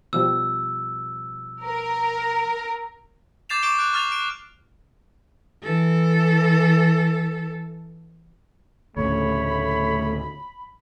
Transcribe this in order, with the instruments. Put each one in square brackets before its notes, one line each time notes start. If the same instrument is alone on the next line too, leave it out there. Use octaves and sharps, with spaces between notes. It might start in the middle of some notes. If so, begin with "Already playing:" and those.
[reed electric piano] B2 F3 G3 [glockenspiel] E6
[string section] A#4
[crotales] D6 G6 A6 C7 E7 F7
C#6 D6 G6 D7 E7 G7
F#6 D7 F7
C#6 F6 A6 F7
D7
[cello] E3 A4
[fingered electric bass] D2 A2 C#3 [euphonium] A3 [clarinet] C#5 [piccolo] B5